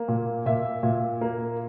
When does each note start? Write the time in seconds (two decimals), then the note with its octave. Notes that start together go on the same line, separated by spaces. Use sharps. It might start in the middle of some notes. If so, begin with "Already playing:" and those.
Already playing: A#3
0.08 A#2
0.46 A#2 E5
0.83 A#2
1.21 A#3